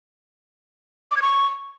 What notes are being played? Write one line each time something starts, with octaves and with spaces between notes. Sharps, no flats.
D6
G#6
C#6